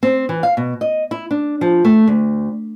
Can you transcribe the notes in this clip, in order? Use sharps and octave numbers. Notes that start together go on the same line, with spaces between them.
C4
E3
F5
B2
D#5
E4
D4
F3
A3
D2